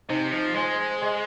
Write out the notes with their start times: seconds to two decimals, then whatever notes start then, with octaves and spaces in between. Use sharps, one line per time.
0.09 C3 D#4 C5 D#5
0.32 F3
0.54 G#3 C5 G#5 C6
1.01 G#4 D#5 G#5 C6